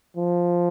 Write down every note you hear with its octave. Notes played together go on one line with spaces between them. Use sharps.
F3